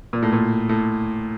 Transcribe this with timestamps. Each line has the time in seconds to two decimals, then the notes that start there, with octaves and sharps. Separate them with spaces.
0.13 A#2
0.22 A2
0.33 A#2
0.69 A2